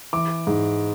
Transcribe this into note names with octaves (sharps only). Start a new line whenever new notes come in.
E3 D6
G#2